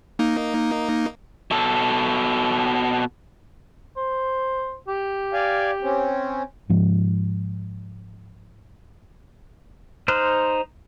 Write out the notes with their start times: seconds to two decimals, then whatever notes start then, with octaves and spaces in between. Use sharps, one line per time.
0.19 A#3 D#4
1.51 B2 A4
3.97 C5
4.88 G4
5.33 D5 F5 G#5
5.82 C4 C#4
6.69 G#2 F3 G#3
10.08 D#4 C5 C6 F6 F#6